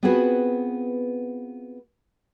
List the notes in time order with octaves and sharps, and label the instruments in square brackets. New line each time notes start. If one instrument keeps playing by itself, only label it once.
[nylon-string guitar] B3 C4 F4 F#4 G#4 B4